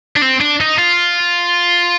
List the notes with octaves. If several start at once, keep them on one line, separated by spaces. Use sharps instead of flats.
D4
C4
D4
D#4
F4